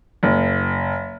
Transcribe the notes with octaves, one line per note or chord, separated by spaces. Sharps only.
F#1